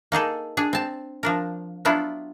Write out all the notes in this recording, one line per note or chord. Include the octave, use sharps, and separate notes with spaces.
A#3 D#4 G#4 A4
D4 G#4
C4 A5
F3 D4 A#4
F#3 B3 D4 E4 F4